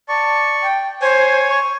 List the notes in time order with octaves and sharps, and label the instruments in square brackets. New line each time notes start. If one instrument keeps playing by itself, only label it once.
[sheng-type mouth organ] D5 C#6 [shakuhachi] A5
[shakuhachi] G5
[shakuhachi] C5 [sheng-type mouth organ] C#5 G#5
[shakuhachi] C#6